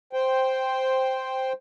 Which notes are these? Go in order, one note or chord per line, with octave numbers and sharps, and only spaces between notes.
C5 G5